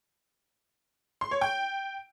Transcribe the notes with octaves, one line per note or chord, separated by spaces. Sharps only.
C6
C#5
G5